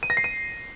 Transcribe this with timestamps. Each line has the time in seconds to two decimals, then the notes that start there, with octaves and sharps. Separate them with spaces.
0.03 D#7
0.10 A#6
0.17 C7
0.24 D#7